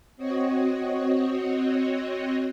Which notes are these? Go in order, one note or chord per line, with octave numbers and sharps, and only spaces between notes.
C4 F#4 C#5 D#5